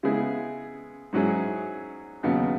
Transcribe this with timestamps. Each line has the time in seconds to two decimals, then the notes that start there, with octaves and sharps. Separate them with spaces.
0.03 C#3 G#3 B3 E4 G#4
1.13 G#2 F#3 C#4 E4 G#4
2.23 D#2 C#3 F#3 B3